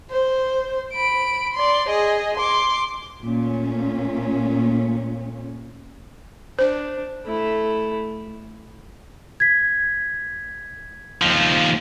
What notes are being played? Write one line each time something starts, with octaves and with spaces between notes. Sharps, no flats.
C5
B5 D7
D5 C6
G#4 D#5
C6 D6
A#2 A3 C#4
D4 C5
A3 E4
G#6 B6
D#2 F3